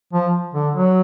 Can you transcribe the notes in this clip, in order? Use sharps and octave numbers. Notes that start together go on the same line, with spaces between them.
F3
D3
F#3